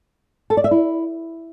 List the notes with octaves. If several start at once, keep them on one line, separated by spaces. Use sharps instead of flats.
A4
D5
E5
E4